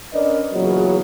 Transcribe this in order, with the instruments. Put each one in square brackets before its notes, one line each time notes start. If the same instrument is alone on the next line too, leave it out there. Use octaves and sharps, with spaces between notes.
[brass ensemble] C#4 D4 A#4 B4 D5 D#5
E2 A#2 C#3 F#3